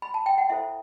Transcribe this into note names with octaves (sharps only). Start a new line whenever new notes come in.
B5
A5
G5
F#5
E4 A4 C5 E5